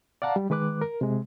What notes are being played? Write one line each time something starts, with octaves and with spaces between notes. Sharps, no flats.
D5 F5 F#5 A5 A#5
G3
D#3 G#3 B4 D6 F#6
A#4
C3 G#3